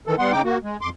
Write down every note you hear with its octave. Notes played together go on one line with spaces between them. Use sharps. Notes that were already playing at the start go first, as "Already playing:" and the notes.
D#3 E3 A4
G3 B3 F#5 C6
C#3 D#4 G5 D6
A#3 F#4
G#3
F2 C6 D6